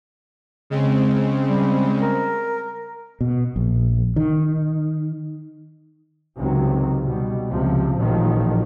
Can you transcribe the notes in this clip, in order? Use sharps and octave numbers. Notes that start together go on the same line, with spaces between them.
C#3 G#3 C4
G3
A#4
B2
A#1
D#3
C#2 C3 D#3 F#3
B2 G3
C#2 C3 F3
A1 A#2 D#3 F3 F#3